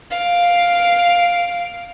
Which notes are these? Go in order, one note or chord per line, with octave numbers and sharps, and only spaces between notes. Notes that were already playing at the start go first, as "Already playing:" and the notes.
F5 D7